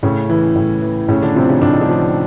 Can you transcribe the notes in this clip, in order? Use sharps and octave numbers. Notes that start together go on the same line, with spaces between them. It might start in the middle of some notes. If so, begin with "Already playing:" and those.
A2 C#3 C#4
E3
A2
E3
A2 C#3 C#4
D3 D4
C3 F3 C4
C#3 C#4
A2 D4
D#4
D3 D4
F3